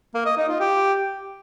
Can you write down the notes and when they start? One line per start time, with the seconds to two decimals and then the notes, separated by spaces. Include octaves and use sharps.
0.14 A#3
0.26 D#5
0.37 D#4
0.48 F4
0.60 G4